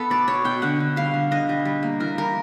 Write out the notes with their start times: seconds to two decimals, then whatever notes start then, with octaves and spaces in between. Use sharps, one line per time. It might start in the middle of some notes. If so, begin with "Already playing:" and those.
Already playing: B3 A4
0.10 B2 D5
0.27 B2 C#5
0.45 B2 G5
0.62 D3 F#5
0.80 D3
0.96 G3 F5
1.14 D3
1.31 D3 D#5
1.49 G3
1.65 G3
1.83 A#3
2.00 E3 A#4
2.18 G3 A#4